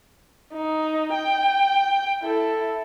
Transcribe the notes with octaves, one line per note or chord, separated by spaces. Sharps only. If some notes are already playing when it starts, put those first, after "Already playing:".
D#4
G5
E4 A4